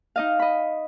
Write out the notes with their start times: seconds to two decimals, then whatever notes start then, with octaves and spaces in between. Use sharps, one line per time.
0.16 D#4 D#5 F5
0.39 D#5 B5